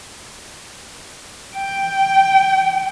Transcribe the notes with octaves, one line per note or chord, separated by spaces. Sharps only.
G5